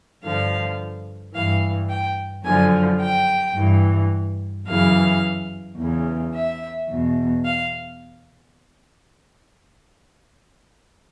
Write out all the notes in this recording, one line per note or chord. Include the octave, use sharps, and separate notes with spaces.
G2 D3 F3 F5
G2 E3 F5
G5
F#2 D3 F3 G#5
G5
G2 E3
F#2 C#3 E3 F5
E2 C#3 E3
E5
E2 B2
F5